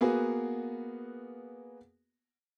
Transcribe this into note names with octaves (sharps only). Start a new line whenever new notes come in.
A#3 B3 F#4 G#4 B4